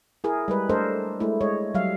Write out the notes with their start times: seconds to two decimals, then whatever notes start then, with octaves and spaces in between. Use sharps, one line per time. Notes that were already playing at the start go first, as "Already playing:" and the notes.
0.24 E4 G#4 A#4
0.48 G3 G#3 B4
0.69 A3 D4 A4 A#4 C5 D#5
1.20 G#3 A3 E4
1.41 G#3 C#5 D#5
1.74 F#3 G3 E5 F5